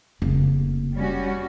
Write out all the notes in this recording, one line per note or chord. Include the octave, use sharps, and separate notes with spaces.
F1 C#3 A#3
G3 C#4 F#4